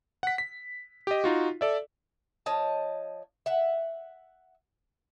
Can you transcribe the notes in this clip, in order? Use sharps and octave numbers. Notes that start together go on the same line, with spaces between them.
F#5 B6
B6
G4 D#5
D#4 F4 F#4
A4 D5 E5
F3 C#5 D#5 A5
E5 F#5